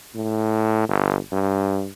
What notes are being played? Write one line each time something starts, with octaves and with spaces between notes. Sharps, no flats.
A2
G1
G2